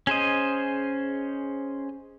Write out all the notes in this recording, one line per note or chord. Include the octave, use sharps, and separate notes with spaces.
C#4 G#4 C5 D#5